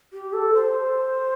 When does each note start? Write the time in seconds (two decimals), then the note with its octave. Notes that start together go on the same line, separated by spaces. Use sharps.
0.13 G4
0.33 A4
0.54 C5